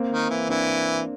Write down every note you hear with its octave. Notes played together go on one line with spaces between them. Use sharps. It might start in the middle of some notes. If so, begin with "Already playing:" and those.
Already playing: A#3 C4
D#3
E3
E3 C4 D4